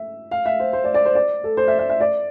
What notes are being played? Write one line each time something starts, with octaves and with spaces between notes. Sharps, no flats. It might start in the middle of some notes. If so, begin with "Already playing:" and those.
Already playing: E5
F5
E5
C5
C5
D5
D5
C5
D5
A4
C5
E5
E5
E5
D5